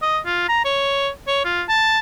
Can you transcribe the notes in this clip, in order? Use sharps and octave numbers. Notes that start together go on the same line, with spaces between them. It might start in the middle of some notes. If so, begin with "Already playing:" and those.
D#5
F4
A#5
C#5
C#5
F4
A5